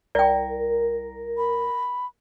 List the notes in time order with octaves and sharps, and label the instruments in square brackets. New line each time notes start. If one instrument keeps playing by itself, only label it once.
[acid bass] C2 [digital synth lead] A#4 [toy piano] D5 G5
[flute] B5